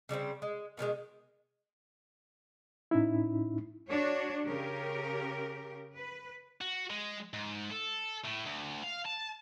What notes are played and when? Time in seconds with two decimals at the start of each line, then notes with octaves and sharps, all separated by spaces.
0.09 C#3 G3 A3 C4
0.42 G#3
0.77 B2 D#3 G3 G#3
2.91 A2 C#4 D#4 E4
3.90 D4 F#4 C#5
4.45 C#3 G4 A#4
5.94 B4
6.61 F#4
6.90 G#3
7.34 G#2
7.71 A4
8.25 A2
8.46 D2
8.84 F5
9.06 A5